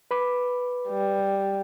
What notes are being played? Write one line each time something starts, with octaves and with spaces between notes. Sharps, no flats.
B4 B5 D6
G3